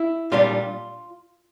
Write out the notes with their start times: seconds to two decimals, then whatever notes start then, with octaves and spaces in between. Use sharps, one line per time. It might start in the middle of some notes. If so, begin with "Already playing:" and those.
Already playing: E4
0.32 A#2 G3 D4 F4